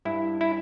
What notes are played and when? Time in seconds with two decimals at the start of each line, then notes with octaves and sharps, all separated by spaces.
0.05 G2 E4
0.41 E4